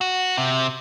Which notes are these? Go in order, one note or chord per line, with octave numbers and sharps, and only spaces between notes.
F#4
C3